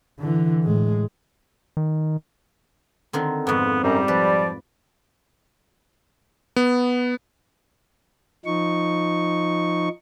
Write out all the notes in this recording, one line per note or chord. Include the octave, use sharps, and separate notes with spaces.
D3 E3
A2 G#3
D#3
D3 D#3 C4
F2 G#2 B3
F#2 G3 C5 A#5
F3 B4 D5
B3
F3 D#4 C#6